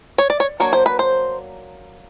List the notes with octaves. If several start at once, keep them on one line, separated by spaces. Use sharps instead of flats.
C#5
D5
C#5
F#3 A#3 D4 C#5
C5
B4
C5